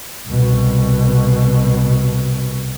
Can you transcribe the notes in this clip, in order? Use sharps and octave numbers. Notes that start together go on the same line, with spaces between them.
C2 B2